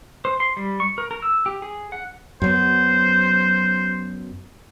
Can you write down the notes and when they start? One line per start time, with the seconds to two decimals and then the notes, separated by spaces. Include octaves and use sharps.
0.25 C5
0.40 C6
0.57 G3
0.80 C#6
0.98 A#4
1.11 A#4
1.22 E6
1.46 G4
1.62 G#4
1.92 F#5
2.42 F#2 F#3 B3 C5